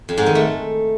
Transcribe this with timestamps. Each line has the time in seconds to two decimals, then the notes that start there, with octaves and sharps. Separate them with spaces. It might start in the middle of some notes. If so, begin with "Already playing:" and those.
0.09 F2
0.18 G#2
0.26 D#3
0.35 A3